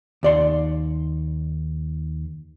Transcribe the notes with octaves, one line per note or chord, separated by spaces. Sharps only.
D#2 D5 C6